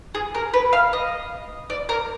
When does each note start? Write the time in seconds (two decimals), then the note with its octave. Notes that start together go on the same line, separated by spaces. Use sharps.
0.15 G#4
0.35 A#4
0.54 B4
0.73 F5
0.93 D#5
1.70 D5
1.89 A#4